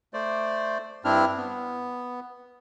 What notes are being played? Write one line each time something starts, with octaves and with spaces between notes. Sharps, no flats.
A3 C5 D5
G2 C4 D4 E4 F6
B3